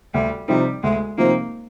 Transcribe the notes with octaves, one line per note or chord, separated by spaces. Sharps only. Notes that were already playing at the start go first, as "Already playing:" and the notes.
D2 G3
C3 F3 G3 C4 D#4
D2 G#3
C3 F3 A#3 C4 D#4